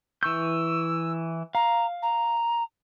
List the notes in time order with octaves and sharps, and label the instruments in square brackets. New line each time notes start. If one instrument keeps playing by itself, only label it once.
[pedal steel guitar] E3 C#6 G6 [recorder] E6
[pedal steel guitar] F5 [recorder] A#5
[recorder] A#5